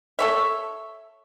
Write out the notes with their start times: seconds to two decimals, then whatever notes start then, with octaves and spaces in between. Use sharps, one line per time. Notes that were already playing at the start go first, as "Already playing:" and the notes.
0.19 A4 C#5 E5